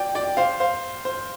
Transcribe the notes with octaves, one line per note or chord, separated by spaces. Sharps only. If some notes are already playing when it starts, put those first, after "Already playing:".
Already playing: D5 G5
D5 G5
C5 F5
C5 F5
C5